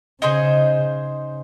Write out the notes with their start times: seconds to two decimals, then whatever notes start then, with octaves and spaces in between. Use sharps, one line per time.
0.22 C#3 D#4 G#4 C5 D#5
1.08 C#3